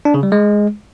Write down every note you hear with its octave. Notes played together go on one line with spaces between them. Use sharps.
D4
C#3
G3
G#3